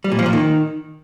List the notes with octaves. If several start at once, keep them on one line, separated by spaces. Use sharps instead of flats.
G3
A#2
F3
A#2
D#3